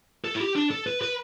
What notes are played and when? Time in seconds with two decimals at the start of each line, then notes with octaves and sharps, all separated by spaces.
0.24 A4
0.35 E4
0.40 G4
0.56 D4
0.71 A4
0.87 B4
1.02 B4